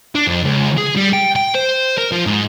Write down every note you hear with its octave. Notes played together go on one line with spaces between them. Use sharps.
D4
F2
C#2
G#4
G3
G5
G5
C5
A#4
F3
G#2